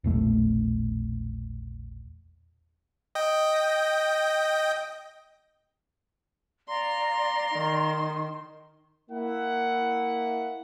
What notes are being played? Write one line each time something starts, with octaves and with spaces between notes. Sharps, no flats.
E1 A#1 A3
D#5 G5
D5 F5 A#5 C6
D#3
A#3 E4 F#5